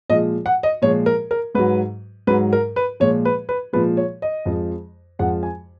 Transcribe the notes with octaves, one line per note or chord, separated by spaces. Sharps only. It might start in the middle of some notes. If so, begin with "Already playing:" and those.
A#2 F3 G#3 D#5
F#5
D#5
A#2 F3 G#3 C#5
A#4
A#4
G#2 F#3 B4
G#2 F#3 B4
A#4
B4
A#2 F3 G#3 C#5
B4
B4
A#2 F3 G#3 B4
C#5
D#5
F2 F3 G#3
F2 F3 G#3 F#5
G#5